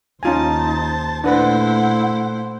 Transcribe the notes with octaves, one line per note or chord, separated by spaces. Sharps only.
D#2 C#4 D#4 F4 C5 G#5 A5
A#2 A3 D4 E4 B4 C5 F#5